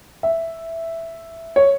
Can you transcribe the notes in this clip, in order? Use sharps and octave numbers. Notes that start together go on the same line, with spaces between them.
E5
C#5